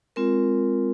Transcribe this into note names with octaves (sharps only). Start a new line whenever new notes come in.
G#3 C4 F4 A#4